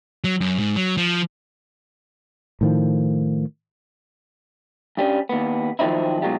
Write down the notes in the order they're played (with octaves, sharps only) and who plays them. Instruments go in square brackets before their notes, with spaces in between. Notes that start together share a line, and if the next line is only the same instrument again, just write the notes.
[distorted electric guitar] F#3
F#2
G#2
F#3
F3
[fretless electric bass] A2 D#3 F3
[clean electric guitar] G2 G3 C#4
D#2 B3
D#3 F3 F#3 C4 D#4 E4
B2 F#3 G#3 D#4 F4 G4